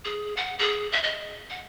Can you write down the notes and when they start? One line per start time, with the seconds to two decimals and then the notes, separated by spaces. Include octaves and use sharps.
0.05 G#4
0.37 F#5
0.59 G#4
0.92 E5
1.03 D#5
1.50 F#5